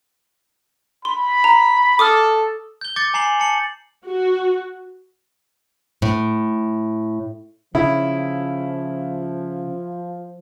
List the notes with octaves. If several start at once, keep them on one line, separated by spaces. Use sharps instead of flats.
B5 C6
A#5
A4 D6 D#6 F6
G6 G7
D6 G6 A6 C#7
G#5 A#5 C7 F#7
A5 C#7 F#7
F#4
A2
C#3 F3 E4